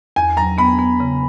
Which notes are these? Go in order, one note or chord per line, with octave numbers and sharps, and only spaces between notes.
E2 G#5
F#3 A#5
B3 B5
B3
C#3